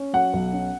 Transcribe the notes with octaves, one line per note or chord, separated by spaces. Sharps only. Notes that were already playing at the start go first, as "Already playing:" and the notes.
Already playing: C#4
F#3 F#5
B1
C#4